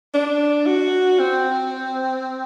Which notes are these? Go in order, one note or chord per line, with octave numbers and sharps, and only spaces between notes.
D4
F#4
C4